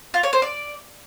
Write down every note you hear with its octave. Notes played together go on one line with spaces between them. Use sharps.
F4
C#5
C5
D5